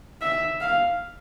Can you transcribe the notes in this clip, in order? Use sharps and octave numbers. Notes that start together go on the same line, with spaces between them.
E5
F5